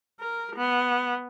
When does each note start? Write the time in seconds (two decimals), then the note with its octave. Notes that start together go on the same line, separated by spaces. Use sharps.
0.20 A#4
0.56 B3